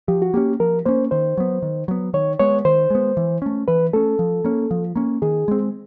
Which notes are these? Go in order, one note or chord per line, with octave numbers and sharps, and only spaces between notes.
F3 G4
F#4
A#3 C#4 G4
F3 A#4
A#3 C#4 C5
D#3 C5
F#3 B3
D#3
F#3 B3
D#3 C#5
G#3 B3 C#5
D#3 C5
G#3 B3
E3
A3 C#4
E3 B4
A3 C#4 A4
F3
A#3 C#4
F3
A#3 C#4
D#3 G#4
G#3 C4